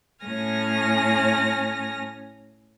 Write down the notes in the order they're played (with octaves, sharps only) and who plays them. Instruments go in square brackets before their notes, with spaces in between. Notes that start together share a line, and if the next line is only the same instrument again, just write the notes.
[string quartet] A2 C#4 G#5 F6 A#6